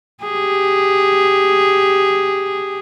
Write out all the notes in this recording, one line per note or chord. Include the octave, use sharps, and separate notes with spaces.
G4 G#4